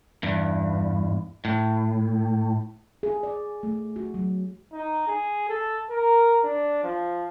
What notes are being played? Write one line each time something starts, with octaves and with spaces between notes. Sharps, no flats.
E2 G2
A2
G#4
D5
A3
F#4
F#3
D#4
G#4
A4
A#4
D4
F3